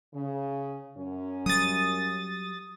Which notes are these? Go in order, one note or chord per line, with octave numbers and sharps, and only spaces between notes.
C#3
F#2 C#4
F#3 G3 D#6 A6